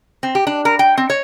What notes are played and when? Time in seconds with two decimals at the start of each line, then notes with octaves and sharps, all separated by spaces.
0.23 C4
0.35 G4
0.47 D4
0.65 A#4
0.79 G5
0.98 C4
1.10 C#5